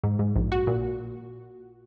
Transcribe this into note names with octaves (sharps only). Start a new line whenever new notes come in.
G#2
G#2
A#1
F#4
A#2